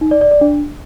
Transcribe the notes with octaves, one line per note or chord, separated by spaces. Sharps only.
D#4
D5
D5
D5
D4